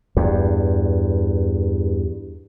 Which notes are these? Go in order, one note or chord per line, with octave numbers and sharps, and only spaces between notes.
E2 G2